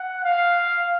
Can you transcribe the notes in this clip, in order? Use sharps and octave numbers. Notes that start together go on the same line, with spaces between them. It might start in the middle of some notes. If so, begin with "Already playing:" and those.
Already playing: F#5
F5